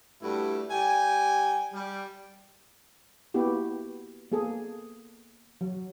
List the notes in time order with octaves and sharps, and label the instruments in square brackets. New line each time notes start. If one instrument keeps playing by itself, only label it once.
[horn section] G2 G3 A3 E4 F#4
G3 G5 G#5
G3
[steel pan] A#3 B3 E4 F#4 G4
A#3 B3 G#4 A4
F#3